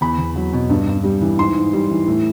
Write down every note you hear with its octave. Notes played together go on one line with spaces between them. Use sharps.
E2 B5
E2
F#3
B2
G2
G2
G3
E3
G#2 C6
G#2
G3
E3
A2